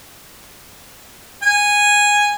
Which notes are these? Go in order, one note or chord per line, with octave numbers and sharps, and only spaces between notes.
G#5